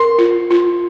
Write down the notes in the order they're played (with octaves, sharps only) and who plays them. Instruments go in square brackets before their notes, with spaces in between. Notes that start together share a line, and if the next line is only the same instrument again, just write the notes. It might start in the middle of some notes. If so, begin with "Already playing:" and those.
Already playing: [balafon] A#4 [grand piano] C6
[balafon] F4
F4